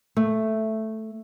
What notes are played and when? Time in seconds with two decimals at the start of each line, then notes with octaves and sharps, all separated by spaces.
0.17 A3